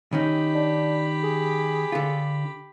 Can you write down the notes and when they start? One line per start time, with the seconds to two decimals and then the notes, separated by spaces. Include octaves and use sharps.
0.13 D#3 C#4 D#4 G4 B5
0.55 D4
1.24 G#4
1.92 D3 F4